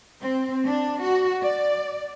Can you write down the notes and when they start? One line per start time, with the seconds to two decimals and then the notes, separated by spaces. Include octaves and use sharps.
0.21 C4
0.67 D4
1.03 F#4
1.42 D5